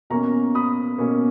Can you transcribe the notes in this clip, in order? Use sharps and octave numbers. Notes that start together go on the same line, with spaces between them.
B2 A#3 C#4 A#5 C#6
B5 D#6
B2 A#3 C#4